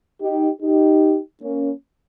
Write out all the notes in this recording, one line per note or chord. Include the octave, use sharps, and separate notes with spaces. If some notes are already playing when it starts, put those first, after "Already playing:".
D#4 G4
D#4 G4
A#3 C#4